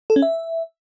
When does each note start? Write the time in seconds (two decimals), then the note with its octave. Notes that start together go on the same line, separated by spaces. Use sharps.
0.10 A4
0.16 C#4
0.22 E5